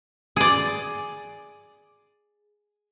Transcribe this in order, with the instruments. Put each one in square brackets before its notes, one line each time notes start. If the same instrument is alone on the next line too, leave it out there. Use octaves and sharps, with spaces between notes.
[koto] G#4 D5